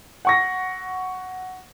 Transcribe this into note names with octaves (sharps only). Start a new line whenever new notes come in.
F#5 C#6 A#6